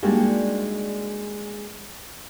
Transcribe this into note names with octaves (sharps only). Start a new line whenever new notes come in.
G3 G#3 A#3 D4 D#4 F#4